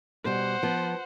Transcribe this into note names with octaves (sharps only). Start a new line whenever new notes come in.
B2 G3 C5 F#5
F3 B3